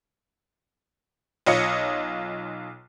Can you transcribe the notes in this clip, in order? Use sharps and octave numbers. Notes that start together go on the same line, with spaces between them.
B1 F4 C#5 D#5 C#7